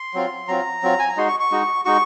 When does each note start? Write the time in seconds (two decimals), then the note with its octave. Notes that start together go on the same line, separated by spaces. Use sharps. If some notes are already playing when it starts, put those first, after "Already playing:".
Already playing: C6
0.14 F#3 C4 F4
0.48 F#3 C4 F4 A#5
0.82 F#3 C4 F4
0.99 G#5
1.09 A#5
1.16 G#3 D#4 F#4 C6
1.28 C#6
1.40 C#6
1.51 G#3 D#4 F#4
1.85 G#3 D#4 F#4 C#6